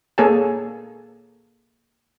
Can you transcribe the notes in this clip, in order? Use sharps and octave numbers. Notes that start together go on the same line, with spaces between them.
A#3 G#4 A4 C#5 G#5 A5